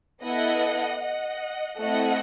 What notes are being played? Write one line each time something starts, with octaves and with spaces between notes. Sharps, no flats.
B3 E4 A4 D#5 F#5
D#5 F#5
A3 C4 E4 A4 D#5 F#5